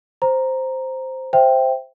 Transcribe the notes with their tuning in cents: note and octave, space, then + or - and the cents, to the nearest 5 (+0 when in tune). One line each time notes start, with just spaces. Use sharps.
C5 +0 A#5 +0
C5 +0 E5 +10 G5 +0